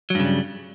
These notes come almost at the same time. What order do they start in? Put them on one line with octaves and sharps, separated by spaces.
F#3 G2 C#3 G3